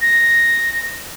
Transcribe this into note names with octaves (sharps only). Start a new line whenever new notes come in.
A#6